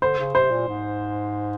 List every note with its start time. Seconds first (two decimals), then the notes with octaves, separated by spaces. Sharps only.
0.02 D3 C5
0.19 C#3
0.35 C3 C5
0.51 A#2
0.68 G#2